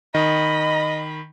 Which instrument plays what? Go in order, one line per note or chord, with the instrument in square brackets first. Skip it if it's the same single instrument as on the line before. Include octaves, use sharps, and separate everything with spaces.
[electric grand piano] D#3 [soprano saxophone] D#5 [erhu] B5